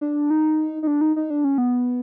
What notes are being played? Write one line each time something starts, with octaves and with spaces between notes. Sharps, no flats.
D4
D#4
D#4
D4
D#4
D#4
D4
C#4
B3